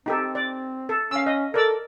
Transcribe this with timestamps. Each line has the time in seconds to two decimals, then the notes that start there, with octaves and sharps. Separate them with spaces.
0.06 C4 D#4 G4 A4
0.35 D5
0.89 A4
1.11 C#4 F5 E6
1.26 D#5
1.54 A4 A#4 D5 E6